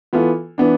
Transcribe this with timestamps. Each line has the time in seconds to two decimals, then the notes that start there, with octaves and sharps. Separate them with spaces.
0.13 E3 B3 F4 A4
0.58 E3 B3 D4